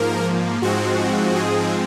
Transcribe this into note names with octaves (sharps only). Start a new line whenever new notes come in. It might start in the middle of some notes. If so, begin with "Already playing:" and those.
Already playing: G#2 F3 A#3 A#4
G#2 F3 G#3 C4 F#4
G#4